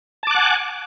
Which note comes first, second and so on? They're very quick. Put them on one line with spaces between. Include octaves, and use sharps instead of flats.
A5 D6 F#6 F#5 G#5